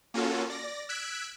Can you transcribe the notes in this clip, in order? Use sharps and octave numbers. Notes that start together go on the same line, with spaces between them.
A#3 C#4 F4 F#4 A4
D5 A#6
E6 F#6 G#6 B6 D7